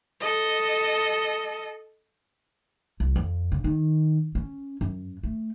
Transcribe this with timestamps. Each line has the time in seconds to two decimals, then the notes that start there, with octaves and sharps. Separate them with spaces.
0.20 A4 D#5
3.00 C2
3.16 F2
3.52 C#3
3.64 D#3
4.35 C#4
4.81 F#2
5.23 A3